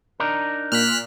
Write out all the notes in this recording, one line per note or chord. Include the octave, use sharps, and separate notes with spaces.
D4 D#4 A#4
A#2 F6 F#6 B6